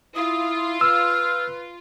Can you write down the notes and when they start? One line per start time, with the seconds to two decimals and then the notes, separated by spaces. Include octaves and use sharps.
0.16 E4 F4 D#6
0.81 B4 E6 F6